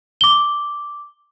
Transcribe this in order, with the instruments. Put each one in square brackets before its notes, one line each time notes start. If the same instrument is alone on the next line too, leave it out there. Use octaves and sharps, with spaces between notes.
[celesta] D6 G7